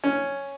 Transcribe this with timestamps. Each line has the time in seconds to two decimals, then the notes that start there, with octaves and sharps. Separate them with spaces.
0.04 C#4